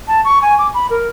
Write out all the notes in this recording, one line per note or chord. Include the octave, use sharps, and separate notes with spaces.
A5
C#6
G#5
D6
B5
A#4